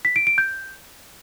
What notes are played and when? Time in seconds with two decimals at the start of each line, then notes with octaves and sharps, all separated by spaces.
0.05 B6
0.16 D7
0.27 D7
0.38 G6